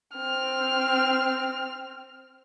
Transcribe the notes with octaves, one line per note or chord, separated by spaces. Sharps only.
C4 F6